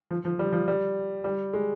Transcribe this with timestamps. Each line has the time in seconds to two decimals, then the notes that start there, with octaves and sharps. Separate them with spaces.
0.11 F3
0.25 F3
0.39 G3
0.53 F3
0.68 G3
1.24 G3
1.53 G#3